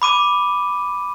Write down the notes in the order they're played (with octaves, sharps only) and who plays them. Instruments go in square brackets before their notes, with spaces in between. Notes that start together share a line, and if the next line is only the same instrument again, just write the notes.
[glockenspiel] B5 D6 D#7